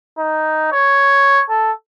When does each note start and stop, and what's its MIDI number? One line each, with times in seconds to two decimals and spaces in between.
0.18 0.71 63
0.72 1.42 73
1.50 1.71 69